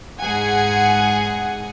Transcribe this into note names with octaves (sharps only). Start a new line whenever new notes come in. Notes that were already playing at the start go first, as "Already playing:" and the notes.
G#2 G#4 F#5 G#5